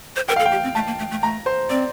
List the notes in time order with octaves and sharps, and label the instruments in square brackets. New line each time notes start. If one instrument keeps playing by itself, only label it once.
[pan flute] C5
[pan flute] A#4 [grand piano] G5
[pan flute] A4 [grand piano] F5
[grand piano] G5
[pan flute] G4
C4
[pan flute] A3 [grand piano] A5
[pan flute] A#3
A3
A3
[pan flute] A3 [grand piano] A#5
[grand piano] C5
[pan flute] C4 [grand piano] D5